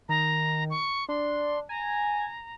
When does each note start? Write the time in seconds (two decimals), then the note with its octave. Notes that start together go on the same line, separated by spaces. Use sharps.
0.09 D#3 A#5
0.70 C#6
1.09 D4 C6
1.69 G#5 A#5